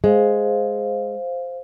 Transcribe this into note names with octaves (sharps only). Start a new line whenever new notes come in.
G#3 C5 F5